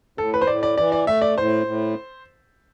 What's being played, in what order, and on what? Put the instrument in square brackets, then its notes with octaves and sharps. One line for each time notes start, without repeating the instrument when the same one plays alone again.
[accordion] A2 [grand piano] A4
[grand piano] B4
C5
[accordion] A2 [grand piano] D5
[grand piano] D5
[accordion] E3 [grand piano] D5
[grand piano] D5
[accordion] A3 [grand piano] E5
[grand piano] D5
[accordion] A2 [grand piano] C5
[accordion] A2